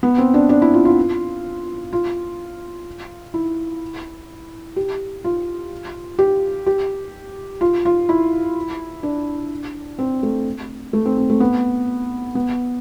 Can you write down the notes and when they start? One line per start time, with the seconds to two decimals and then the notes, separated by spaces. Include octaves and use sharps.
0.03 B3
0.18 C4
0.34 D4
0.49 D4
0.62 E4
0.74 F4
0.85 F4
1.93 F4
3.34 E4
4.76 G4
5.24 F4
6.19 G4
6.66 G4
7.61 F4
7.85 F4
8.09 E4
9.03 D4
9.99 C4
10.23 A3
10.93 A3
11.05 C4
11.18 C4
11.30 A3
11.40 B3
12.35 B3